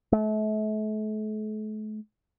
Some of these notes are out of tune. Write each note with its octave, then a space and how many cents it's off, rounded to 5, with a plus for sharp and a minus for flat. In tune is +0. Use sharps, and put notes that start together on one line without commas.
A3 -40